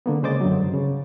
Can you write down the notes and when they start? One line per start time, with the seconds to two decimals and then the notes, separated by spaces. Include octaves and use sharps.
0.06 D3 A#3 B3
0.23 C#3 G#3 C5 D#5 D6 A6
0.41 F#2 D3 F#3
0.59 G2
0.73 C#3